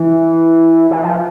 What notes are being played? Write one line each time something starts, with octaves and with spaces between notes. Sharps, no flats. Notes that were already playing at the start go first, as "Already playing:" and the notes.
Already playing: E3
E3
F3